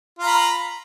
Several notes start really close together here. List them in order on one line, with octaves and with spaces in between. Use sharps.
F4 A#5 B5